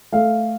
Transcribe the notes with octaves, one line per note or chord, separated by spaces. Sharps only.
A3 F5